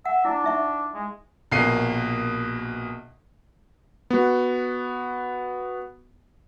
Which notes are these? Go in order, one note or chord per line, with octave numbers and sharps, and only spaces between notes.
E5 F#5
D4 E4
D#4 E5 C#6
G#3
A#1 B2 A#3 C7 D#7
B3 F#4